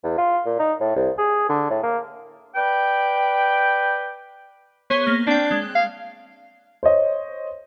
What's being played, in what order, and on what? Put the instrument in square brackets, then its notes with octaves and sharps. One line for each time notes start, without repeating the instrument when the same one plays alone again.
[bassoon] E2
F4
A#2
D#4
A2
C2
G#4
D3
A2
A#3
[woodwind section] B4 D5 G5
[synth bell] B3 G#4 C5 [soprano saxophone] C#5
[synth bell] A#3 F6
[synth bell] C4 G5 [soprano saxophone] D4
[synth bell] G#3 F#6
[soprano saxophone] F5
[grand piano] C5 C#5 D#5